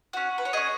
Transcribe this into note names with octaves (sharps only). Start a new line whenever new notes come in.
C#4 F#4 F#5
B4
C#5
C#4 G#4 D#5